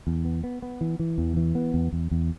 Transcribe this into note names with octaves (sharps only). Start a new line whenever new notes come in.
E2
B3
B3
B3
E3
E3
E2
E3
B3
E2
E2
E2